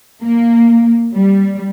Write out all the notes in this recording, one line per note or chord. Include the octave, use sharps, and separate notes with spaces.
A#3
G3